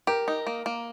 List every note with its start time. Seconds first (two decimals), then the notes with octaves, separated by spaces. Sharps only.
0.07 G4 A#4
0.28 D#4
0.47 A#3
0.66 A#3